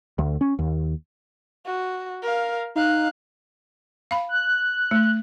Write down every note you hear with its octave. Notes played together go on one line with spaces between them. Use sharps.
D2
C#4
D#2
F#4
A#4 F5
D#4 F5 F#6
F5 B5
F#6
A3